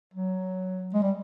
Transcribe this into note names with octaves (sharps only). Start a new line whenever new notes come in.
F#3
G#3
G3